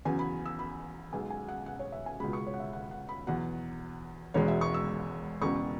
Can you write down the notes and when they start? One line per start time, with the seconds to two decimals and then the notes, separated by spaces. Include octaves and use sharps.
0.05 E2 C#3 F#3 G#5
0.19 B5
0.45 E6
0.59 B5
1.13 B1 B2 G#3 G#5
1.30 G#5
1.48 F#5
1.66 F#5
1.79 C#5
1.92 E5
2.06 G#5
2.20 C#2 B2 G#3 B5
2.33 C#6
2.47 C#5
2.54 F#5
2.60 E5
2.73 F#5
2.91 F#5
3.09 B5
3.27 E2 B2 F#3 F#5
4.34 E1 E2 B2 G#3 C#5
4.48 E5
4.61 C#6
4.74 E6
5.42 E1 E2 C#3 C#6